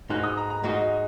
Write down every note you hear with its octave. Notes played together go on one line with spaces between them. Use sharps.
G#2 G#3 D#4 F#4 F#6
D#6
A#5
A#5
G#2 G#3 D#4 F#4 D#5
D#5